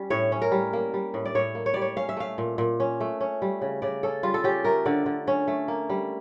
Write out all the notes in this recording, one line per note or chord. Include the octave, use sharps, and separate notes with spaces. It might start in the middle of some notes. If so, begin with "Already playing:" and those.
Already playing: G3 C#4
A2 C#5
C#4
A#4
G3
A#3
G3
A2
D5
A2 C#5
A#3
C#5
G3 D5
C#5
C#4 F5
E5
A3 F5
A#2
A#2
C#4
A3
C#4
G3
C#3
C#3 D5
C#4 A4
G3 F4
A4
C#4 G4
A3 A#4
D3 D5
D3
C#4
A3
A#3
G3